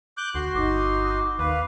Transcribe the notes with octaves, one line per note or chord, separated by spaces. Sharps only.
D6 F#6 G6
D2 F#4 C6
G1 D#4 D6
D#2 B4 F5